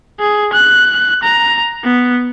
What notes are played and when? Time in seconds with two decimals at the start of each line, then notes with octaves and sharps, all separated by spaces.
0.20 G#4
0.53 F#6
1.23 A#5
1.84 B3